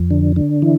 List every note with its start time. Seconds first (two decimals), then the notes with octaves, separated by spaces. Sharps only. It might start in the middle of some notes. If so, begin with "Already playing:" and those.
Already playing: F2
0.11 D3
0.36 D3
0.62 E3